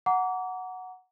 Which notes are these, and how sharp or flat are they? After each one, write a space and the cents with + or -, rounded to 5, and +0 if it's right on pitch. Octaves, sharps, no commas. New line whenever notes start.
F#5 +0 A#5 +0 D6 -35